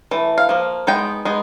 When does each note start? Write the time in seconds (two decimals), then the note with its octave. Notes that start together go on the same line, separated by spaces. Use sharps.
0.11 E3 A3
0.38 F5
0.49 F3 A#3
0.87 G#3 B3 D#4 G5
1.25 G#3 B3 D#4